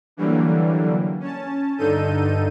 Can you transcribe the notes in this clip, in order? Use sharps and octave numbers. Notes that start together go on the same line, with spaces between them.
D3 E3 F#3 G3 A#3
C#4 A5
G2 D3 D#4 A4 G6 D#7